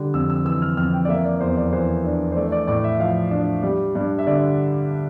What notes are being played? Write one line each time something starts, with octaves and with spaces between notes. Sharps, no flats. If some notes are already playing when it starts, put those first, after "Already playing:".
Already playing: D3 G3
F2 E6
E6
E3 E6
F6
F2 F6
G5
D5
A#3 E5
D5
E2 C5
D5
E3 C5
D4
C5
A3 D5
D5
A2 D5
E5
F3 F5
D4
G3
G2
E5
D3 D5